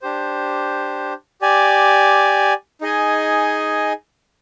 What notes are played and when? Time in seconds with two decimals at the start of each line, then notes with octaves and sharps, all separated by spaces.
0.02 D4 G4 C5
1.41 G4 D5 G#5
2.81 D#4 G#4 D#5 G#5